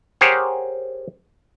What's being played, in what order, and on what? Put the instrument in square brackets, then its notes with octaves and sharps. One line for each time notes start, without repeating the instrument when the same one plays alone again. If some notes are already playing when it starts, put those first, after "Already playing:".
[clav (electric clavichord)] G4 G#4 A#4 C5 C#5 F#5